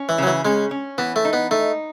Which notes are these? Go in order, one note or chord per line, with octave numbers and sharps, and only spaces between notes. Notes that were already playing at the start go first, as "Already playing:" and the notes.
Already playing: C#4
E3
C#3 F#3
E3
G#3 C#4
C#4
E3 B3
A3
D#4
B3
A3 D#4